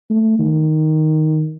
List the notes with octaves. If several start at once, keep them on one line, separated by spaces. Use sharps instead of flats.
A3
D#3